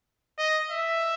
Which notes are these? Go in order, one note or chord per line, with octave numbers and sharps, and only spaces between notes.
D#5
E5